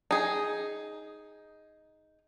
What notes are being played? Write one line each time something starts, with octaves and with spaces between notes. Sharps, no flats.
D#4 G#4